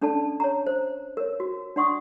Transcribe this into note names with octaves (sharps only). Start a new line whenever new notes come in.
C#4 D4 A4 D5 A5
C#5 A#5
C5
A#4 C#5
F#4
D4 D5 F#5 C6 C#6 D#6